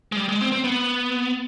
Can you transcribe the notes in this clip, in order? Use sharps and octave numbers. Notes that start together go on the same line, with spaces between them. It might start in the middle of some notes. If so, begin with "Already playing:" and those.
G#3
G3
G#3
C4
C4
B3